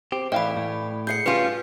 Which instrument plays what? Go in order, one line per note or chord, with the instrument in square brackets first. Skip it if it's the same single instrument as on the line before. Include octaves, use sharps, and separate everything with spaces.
[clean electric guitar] C4 G4
[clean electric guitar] A2 [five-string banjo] E3 F5 G5 [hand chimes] D5 B5
[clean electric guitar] A2
[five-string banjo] G#4 F#5 [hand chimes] G6 C7 C#7
[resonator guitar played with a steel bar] G3 C#4 F4 [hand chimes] B4